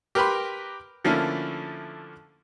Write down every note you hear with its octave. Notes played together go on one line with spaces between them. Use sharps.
G4 A#4 B4 G5 B5 C6
D3 F3 A3 A#3 C#4 E4